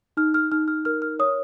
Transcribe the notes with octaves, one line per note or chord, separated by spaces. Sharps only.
D#4 F6
F6
D#4 F6
F6
A#4 F6
F6
C#5 D#6